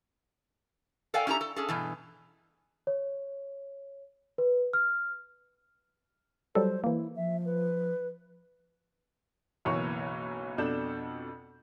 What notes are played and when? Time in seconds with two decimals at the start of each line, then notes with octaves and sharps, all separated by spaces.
1.14 A4 A#4 D5 F5 G5 G#5
1.27 C#4 E4 G4 A4 A#5
1.41 A4
1.56 C#4 G#4 A4
1.68 G2 B2 E3
2.87 C#5
4.38 B4
4.73 F6
6.55 F#3 G3 A4 C5
6.84 E3 A#3 E4
7.16 F3 E5
7.45 B4
9.65 F#1 B1 E3 A#3 C#5 C#6
10.58 F2 B2 D4 A4 G6 E7